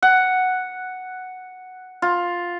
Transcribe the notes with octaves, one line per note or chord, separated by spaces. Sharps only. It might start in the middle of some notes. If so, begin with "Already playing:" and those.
F#5
F4